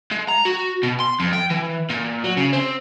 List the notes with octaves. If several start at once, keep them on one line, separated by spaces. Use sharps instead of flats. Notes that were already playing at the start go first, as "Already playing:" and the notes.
G#3
A#5
F#4
B2
C6
F2
G5
E3
A#2
F#3
C#3
C4